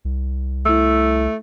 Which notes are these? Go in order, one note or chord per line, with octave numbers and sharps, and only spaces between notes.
C2
A3 E4 E6